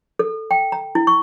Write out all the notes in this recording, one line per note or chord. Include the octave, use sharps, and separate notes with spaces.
A4
G5
A#5
E4
C#6